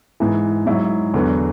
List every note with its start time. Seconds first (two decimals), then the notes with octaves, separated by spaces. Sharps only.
0.20 G#2 E3
0.66 G#2 F#3 E4
1.14 E2 D3 F#3